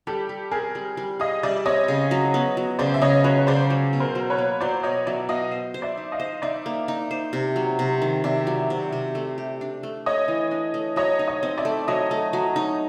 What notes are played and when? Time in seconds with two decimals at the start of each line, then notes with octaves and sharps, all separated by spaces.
0.07 G3 G4 A4
0.29 G3
0.51 C4 G#4 A#4
0.75 G3
0.97 G3
1.20 G#4 D#5 F5
1.43 G3 D5 E5
1.66 C4 C#5 D#5
1.88 C#3
2.11 F#3
2.34 B3
2.57 F#3
2.79 C#3 C5 D5
2.94 E5
3.02 C#3 C#5 D#5
3.24 F#3 B4 C#5
3.47 C#3 C5 D5
3.70 F#3
3.93 B2
4.00 A#4 C5
4.15 F#3
4.30 B4 C#5
4.38 A#3
4.61 F#3 C5 D5
4.83 B2 C#5 D#5
5.07 F#3 D5 E5
5.29 B2 D#5 F5
5.51 C5
5.74 C5
5.82 D5 E5
5.97 D#4
6.12 D#5 F5
6.20 C5
6.42 D#4 D5 E5
6.66 A#3
6.88 D#4
7.11 C5
7.33 C3
7.56 F#3
7.79 C3
8.02 D#3
8.24 C3 D5 E5
8.47 F#3
8.70 C3
8.92 C3
9.15 A3
9.38 G4
9.61 D4
9.83 A3
10.06 A3 C#5 D#5
10.28 E3
10.51 D4
10.74 A3
10.96 F#3 C#5 D#5
11.19 D#4
11.28 C#5 D#5
11.43 C4
11.58 D5 E5
11.65 A3
11.88 F#3 C#5 D#5
12.11 A3
12.33 F#3
12.56 D#4